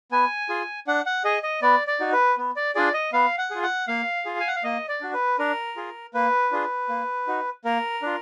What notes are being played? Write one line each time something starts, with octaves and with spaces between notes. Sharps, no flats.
B3 G#5
F4 G#4
D4 F#5
F#5
G#4 D#5
D#5
B3 D5
D5
D#4 F#4
B4
B3
D5
D4 F4 G#4 D5
D#5
B3 F5
F#5
F4 G#4
F#5
A#3 F5
F4 G#4
G#5
F#5
F5
A#3 D#5
D5
D4 F#4
B4
D4 A#4
F4 G#4
A#3 B4
D4 F4 G#4
A#3
D#4 F#4
A#3 A#4
D4 F4